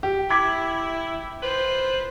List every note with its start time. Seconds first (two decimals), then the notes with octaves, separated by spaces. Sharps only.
0.03 G4
0.30 E4 D6 G#6 B6
1.42 F4 B4 C5